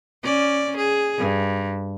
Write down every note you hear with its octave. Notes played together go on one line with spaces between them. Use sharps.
C#4 D5
G#4
G2